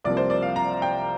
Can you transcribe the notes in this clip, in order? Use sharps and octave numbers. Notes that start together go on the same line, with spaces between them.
C2 C3 F3 A#3 D5
C5
D5
F5
A#5
G5